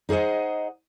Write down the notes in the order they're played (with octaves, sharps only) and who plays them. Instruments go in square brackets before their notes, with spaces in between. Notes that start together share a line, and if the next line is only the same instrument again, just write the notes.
[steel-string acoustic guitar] D#4 G#4 C5 D#5 F#5